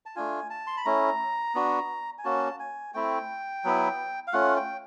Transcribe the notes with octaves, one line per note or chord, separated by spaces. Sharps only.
A5
A3 D4 F4 G#5
A5
C6
B5
A3 C#4 E4 A#5
B3 D4 F#4
G#5
A#3 C#4 F#4 A5
G#5
A3 C4 E4 G5
F#3 B3 E4
F5
A3 C#4 F4 F#5
G5